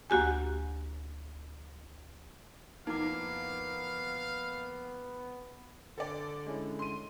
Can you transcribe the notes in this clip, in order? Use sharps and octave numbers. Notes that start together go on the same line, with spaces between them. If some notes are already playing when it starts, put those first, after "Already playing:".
D2 A#3 F#4 G4 G#5
F2 A#3 B3 D#4 E4 F5 D6
D3 A4 D5
G#3 C#4 E4
C6 D#7